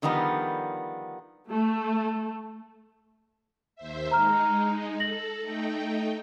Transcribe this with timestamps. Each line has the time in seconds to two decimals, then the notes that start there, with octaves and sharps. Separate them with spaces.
0.02 D3 D#3 F3 G3 B3
1.49 A3
3.76 D#2 C5 E5
4.11 G#3 D#4 A#5 F6
5.00 A4 A#6 F#7
5.40 A3 D#4 G5